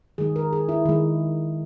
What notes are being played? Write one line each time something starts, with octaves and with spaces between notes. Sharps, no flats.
D#3 G#3 G#4
A#4
G#4
E4
D#3 G#3